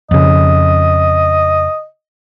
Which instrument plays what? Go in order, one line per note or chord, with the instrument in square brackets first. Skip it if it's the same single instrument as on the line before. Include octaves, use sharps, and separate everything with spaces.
[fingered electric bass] F2 C#3 [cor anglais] D#5